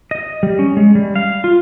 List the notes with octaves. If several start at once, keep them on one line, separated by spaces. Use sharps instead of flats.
D#5
G3
C#4
G#3
G3
F5
F4